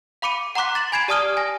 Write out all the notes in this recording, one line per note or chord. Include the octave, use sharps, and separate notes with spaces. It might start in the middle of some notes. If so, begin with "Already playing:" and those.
F5 B5 D6 C#7 D#7
F#5 A#5 C6 D6 F#6 B6
A6 E7 F#7
G#5 B5 G#6 C7 D7 E7
G4 D5 A5 D#6 F6 G7
G#5 A#6